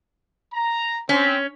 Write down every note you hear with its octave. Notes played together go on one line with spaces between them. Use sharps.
A#5
C4 C#4